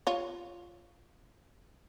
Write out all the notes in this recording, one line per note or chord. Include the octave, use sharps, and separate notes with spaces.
F4 C#5